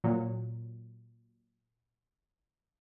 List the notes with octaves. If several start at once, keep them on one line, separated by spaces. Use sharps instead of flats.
A#2 F#3